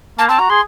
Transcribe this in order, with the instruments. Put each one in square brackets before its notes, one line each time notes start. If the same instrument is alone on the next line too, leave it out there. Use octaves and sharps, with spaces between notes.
[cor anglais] A#3 [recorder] A5
[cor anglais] C4 [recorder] A5
[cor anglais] F#4 [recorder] A#5
[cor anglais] G#4 [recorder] C6